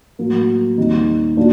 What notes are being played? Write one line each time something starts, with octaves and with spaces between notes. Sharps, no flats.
A2 F#3 A#3
D#2 D#3 G3 C4 D#4
A#2 F#3 A#3 D4